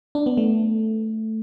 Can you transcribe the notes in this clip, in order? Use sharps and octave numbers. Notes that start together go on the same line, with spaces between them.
D4
B3
A3